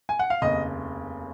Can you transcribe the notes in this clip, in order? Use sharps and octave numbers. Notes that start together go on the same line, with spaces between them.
G#5
F#5
F5
F1 D#2 C#3 D#5